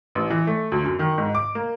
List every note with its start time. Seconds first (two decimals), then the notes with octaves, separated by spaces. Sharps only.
0.15 A1
0.30 E3
0.47 A3
0.72 D2
0.84 F#2
0.99 D#3
1.18 G#2
1.35 D6
1.55 A#3